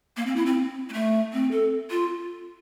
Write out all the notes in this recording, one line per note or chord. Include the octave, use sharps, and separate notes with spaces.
A#3
C4
E4
C4
A#3
A3
C4
A4
F4